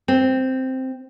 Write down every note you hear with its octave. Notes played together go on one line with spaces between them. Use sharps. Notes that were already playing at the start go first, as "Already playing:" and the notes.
C4